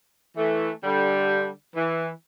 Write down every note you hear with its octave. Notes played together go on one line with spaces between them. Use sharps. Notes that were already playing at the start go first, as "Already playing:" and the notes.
E3 A3
D3 G3
E3